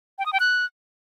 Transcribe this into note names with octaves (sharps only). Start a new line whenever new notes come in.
G5
D#6
G5
F#6